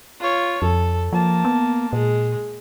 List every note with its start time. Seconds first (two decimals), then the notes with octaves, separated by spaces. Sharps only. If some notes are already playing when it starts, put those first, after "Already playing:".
0.20 F4 C#5
0.62 F2 A4
1.13 F3 A#3 A5
1.45 B3
1.93 A#2 G#3